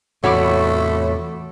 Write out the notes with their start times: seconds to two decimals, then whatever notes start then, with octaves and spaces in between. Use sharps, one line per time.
0.24 E2 A2 C3 A3 F#4 C#5 B5 D6